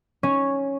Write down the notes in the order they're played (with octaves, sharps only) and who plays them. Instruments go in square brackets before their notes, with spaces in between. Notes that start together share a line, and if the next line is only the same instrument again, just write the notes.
[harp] C#4